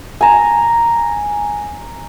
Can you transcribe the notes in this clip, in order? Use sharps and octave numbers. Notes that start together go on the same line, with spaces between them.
G#5 A#5